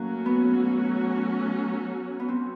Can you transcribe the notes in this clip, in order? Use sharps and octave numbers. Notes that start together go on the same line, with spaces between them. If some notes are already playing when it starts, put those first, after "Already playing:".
Already playing: F#3 A3 A#3 C#4 F#4
B3
B3
C4